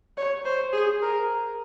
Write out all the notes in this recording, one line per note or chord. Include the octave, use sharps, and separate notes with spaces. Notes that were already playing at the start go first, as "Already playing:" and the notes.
C#5
C5
G#4
A#4